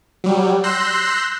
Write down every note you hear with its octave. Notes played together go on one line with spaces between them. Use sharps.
F#3 G3
C6 E6 F#6 G6 A#6 C7